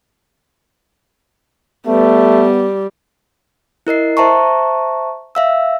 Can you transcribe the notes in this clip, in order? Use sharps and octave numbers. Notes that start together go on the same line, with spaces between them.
G3 A3 B3
E4 A#4 D#5 C7
C5 E5 A5 A#5 C#6
E5 F5 E6